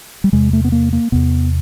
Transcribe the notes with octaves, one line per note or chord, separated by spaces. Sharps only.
G3
E2 C3 G#3
A3
B3
A#3
A#3
E2 C3 B3